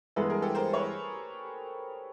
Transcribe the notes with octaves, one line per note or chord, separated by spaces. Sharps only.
G2 E3 G#3 B3 A4 B4
G#4 A#4
G4 A4
A#4 C5
B4 C#5